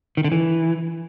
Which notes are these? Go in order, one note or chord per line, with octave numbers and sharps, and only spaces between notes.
D#3
D3
E3